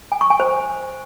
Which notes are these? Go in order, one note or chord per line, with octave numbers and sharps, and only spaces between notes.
G#5
C#6
G#5
C5